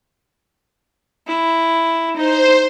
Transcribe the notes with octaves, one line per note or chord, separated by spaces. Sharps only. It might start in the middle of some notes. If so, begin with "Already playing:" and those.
E4
D#4 C5